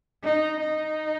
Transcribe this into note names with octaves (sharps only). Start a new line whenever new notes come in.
D#4
D#4